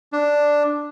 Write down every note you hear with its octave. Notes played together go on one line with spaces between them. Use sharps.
D4